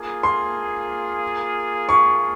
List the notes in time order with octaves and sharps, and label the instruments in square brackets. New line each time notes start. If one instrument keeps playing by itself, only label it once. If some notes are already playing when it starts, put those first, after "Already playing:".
Already playing: [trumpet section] A#3 F4 G#4
[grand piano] C6
C#6